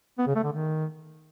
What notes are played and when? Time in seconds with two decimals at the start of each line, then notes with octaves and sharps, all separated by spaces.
0.18 B3
0.27 C#3
0.35 A3
0.44 D3
0.52 D#3